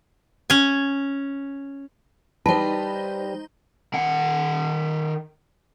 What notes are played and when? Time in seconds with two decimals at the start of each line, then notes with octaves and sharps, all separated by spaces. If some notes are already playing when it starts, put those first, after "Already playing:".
0.50 C#4 G#5
2.46 G3 D#4 B4 C5 A5
3.94 D#3 F#5